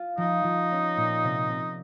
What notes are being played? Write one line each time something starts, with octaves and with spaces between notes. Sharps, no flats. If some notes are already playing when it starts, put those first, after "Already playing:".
Already playing: F4
F3 D#4
F3
C#4
A#2
C3
C3